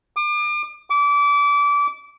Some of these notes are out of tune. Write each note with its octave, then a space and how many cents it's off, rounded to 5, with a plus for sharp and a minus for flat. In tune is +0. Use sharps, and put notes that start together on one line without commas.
D6 +40
D6 -25